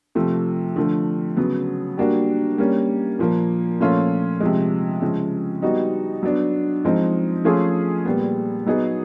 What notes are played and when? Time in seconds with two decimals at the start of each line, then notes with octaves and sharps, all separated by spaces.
0.15 C3 F3 A3
0.76 D3 F3 A3
1.37 C#3 F#3 B3
1.97 G3 A#3 D4 F#4
2.58 G3 A#3 C#4
3.19 A#2 F3 A#3
3.80 A#2 F3 A3 C#4 F4
4.40 C3 F3 G#3
5.02 C#3 F3 G#3
5.62 G3 B3 D#4 F#4
6.23 F#3 B3 D4
6.85 F3 G#3 C4 D#4
7.44 F3 A3 C#4 F4 G#4
8.05 A#2 G3 B3
8.66 F#3 B3 D#4 G#4